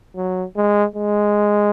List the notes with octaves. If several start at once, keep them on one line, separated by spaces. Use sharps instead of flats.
F#3
G#3
G#3